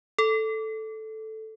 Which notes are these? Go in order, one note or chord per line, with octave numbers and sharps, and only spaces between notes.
A4